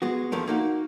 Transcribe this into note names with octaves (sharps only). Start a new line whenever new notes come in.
G#3 B3 F#4
E2 F3 A3 A#4
A#3 D#4 F#4